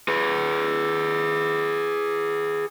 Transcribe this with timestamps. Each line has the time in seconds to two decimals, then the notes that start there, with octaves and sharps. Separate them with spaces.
0.08 G#4 B4